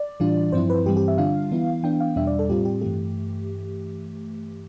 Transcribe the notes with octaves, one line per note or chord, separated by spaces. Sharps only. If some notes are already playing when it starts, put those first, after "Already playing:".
Already playing: D5
A2 E3 G3 D4 F4
G2 F3 C4 E4 C5
B4
G2 E3 G3 C4 G4
G4
E5
D3 G3 D4 F4 F5
E3 B3 E4
E3 B3 D4 G5
F5
E2 B2 G3 D4 E5
D5
A4
A2 G3 C4 F4 G4
G4
G2 E3 A3 G4